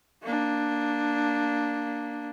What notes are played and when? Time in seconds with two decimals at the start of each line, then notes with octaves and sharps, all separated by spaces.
0.23 A#3 D4